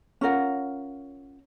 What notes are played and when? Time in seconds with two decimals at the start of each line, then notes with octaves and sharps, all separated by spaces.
0.21 C#4 F4 A#4 F#5